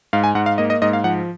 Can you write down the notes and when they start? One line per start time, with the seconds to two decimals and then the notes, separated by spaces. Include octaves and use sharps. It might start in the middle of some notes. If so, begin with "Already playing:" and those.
0.13 G#2 F5
0.24 G#5
0.35 G#2 F#5
0.46 F5
0.58 A#3 D#5
0.70 D#5
0.82 G#2 D#5
0.93 F5
1.04 F3 F#5